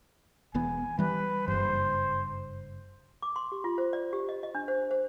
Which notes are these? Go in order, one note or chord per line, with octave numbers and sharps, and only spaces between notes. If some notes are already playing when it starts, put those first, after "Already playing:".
E1 E2 B3 G#5
E3 G3 B4
F#1 G2 C5
D6
C6
G4
F4
C5
D5
G4
D#5
D#5
D4
C5
C5